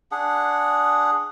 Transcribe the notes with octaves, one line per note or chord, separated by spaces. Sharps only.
D4 G#4 F#5